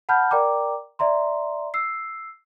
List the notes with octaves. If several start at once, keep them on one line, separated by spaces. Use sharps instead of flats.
F#5 A5 B5 F6 G6
A#4 D5 G5 A#5 D6
D5 E5 A#5 C6
E6 C7